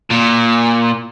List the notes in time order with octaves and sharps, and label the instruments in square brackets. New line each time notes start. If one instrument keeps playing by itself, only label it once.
[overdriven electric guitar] A#2